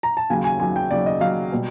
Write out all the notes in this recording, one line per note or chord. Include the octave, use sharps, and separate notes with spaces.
A#5
A5
D#2 C#3 F#3 G#5
G#5
D#2 C#3 F#3 G#5
G5
D#2 C#3 F#3 D5
D#5
D#2 C#3 F#3 F5
B2 G3